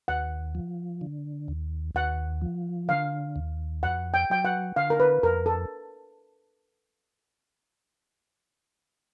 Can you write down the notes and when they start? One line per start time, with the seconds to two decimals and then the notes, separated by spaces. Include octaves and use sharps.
0.08 D#2 F#5
0.55 F3
1.01 D3
1.48 D#2
1.95 D#2 F#5
2.42 F3
2.89 D3 F5
3.36 D#2
3.83 F2 F#5
4.14 G5
4.30 F#3 G5
4.45 F#5
4.76 D3 F5
4.90 A#4
5.00 B4
5.23 F2 A#4
5.46 A4